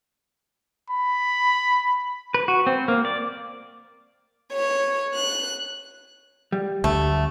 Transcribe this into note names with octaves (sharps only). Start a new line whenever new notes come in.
B5
B4
F#4
C4
A#3
D5
C#5
F#6
G3
D2 A3